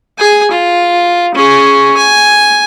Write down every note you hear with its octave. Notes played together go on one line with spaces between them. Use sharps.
G#4 G#5
F4
C#4 G#4
G#5